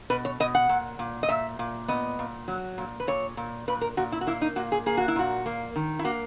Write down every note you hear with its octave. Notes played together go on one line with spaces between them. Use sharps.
B2 B4
C#5
B2 D#5
F#5
A#2
A#2
D#5
A#2 E5
A#2
B3 D#5
A#2
F#3
A#2
B4
A#2 C#5
A#2
A#2 B4
A#4
A#2 F#4
E4
F#4
A#3 E4
D#4
A#2 F#4
G#4
A#3 G#4
F#4
E4
A#2 F#4
A#3
D#3
E4
A#3 F#4